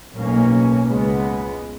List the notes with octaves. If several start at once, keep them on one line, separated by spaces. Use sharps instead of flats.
B1 B2 A#3 C#4
C#2 C#3 G#3 B3